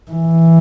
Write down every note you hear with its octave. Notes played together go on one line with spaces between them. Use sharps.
E3